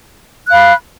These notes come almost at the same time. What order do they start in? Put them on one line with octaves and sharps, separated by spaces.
F#6 F5 B5